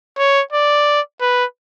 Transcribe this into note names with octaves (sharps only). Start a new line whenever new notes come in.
C#5
D5
B4